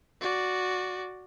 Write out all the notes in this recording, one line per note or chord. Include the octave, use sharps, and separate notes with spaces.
F#4 D5